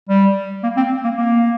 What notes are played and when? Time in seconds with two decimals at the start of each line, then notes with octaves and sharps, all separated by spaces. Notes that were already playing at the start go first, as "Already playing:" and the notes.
0.09 G3
0.63 A#3
0.77 C4
1.04 A#3
1.17 A#3